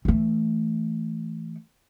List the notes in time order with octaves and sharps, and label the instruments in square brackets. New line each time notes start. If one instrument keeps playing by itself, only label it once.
[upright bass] E3 A3